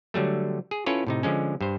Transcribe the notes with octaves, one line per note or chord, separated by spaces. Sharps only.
D3 F#3 G3 A3
G#4
C#4 E4 F4 A4 B4 C#5
A2 C3 D#4
D3 F3 G#3 C#4
G2 C5